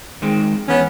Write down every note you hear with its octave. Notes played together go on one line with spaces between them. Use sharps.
D#3 G#3 C4
E2 B3 C#4